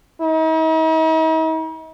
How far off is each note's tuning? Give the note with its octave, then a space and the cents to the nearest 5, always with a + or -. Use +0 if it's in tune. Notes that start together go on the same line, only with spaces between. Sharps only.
D#4 +45